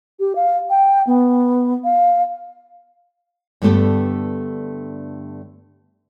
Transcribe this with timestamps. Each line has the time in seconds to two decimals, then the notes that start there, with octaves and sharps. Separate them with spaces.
0.20 G4
0.36 F5
0.70 G5
1.07 B3
1.84 F5
3.62 G2 D3 A3 B3 G4 A4